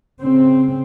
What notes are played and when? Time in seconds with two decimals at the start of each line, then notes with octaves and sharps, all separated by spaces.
0.21 C#3 C4